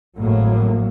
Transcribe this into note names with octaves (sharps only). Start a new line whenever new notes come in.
G#1 A2 F#3 A#3